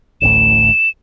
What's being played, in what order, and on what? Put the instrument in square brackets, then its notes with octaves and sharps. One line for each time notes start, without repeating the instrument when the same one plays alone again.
[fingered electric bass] D1 A1 A2 [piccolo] E7